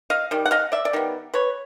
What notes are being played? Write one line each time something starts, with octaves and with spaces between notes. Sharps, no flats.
D#5 F5
D#3 G3
F#5
D#5 F5
D5 E5
D5
D#3 G3 B3
B4 C#5